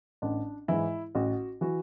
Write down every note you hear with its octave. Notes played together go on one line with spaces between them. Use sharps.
A1 D4
G#2 E3 E4
A1 F#4
E3 F#4